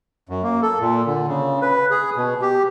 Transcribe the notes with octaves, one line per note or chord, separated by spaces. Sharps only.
F#2
A#3
A4
A#2
D3
C#3
B4
G#4
B2
G4